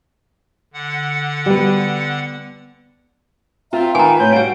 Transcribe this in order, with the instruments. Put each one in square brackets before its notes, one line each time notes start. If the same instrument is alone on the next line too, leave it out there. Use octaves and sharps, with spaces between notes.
[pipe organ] D3 F#5
[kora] G3 B3
[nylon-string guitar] C4 [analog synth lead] F4 [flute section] E5 G5 A#5
[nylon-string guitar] D#3 [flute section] B4 [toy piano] G#5 A#5
[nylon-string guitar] A2 C3 [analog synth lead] G6
[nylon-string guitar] G3 F#4 [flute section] F5 [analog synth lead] D7